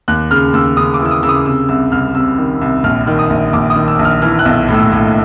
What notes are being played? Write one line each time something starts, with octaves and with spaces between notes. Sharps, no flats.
D#2 F#6
C#3 F6
D#2 E6
C#3 D#6
D6
E3
E6
D#6
C#3 E6
D#6
C3 E6
C2 E6
C2 F6
C3 E6
D#3
C2
A#1 F6
D#3
D#6
A#1
A#1 D6
D#6
D#3
E6
A#1
F6
E3 F6
F#6
B1
A2
E6
A2